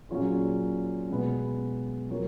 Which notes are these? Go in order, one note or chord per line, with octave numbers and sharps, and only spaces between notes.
A#2 F#3 C#4 F4 G#4
B2 G#3 B3
F#3 A#3 F4 A#4 C#5